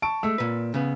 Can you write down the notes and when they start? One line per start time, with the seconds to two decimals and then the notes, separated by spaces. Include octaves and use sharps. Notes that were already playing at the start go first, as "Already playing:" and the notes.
0.02 A5 C#6 D7
0.23 G#3 A3 E6
0.38 A#2 B4
0.74 C#3 B3